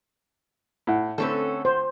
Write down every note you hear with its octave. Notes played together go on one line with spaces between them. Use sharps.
A2 E4 F#5
D3 A3 C4 C#4 A4 B4
C5